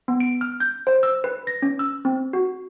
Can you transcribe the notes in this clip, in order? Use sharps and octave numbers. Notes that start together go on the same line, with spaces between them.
B3
D7
F6
G6
C5
E6
B4
A#6
C#4
E6
C4
F#4